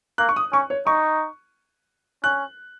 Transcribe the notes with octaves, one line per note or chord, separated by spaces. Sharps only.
A#3 F#6
C#6
D#6
C#4 C#6
C#5
D#4 C#6
C#4 F#6